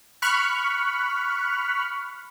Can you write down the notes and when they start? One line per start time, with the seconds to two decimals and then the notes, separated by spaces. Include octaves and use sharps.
0.22 B5 C#6 F6 F#6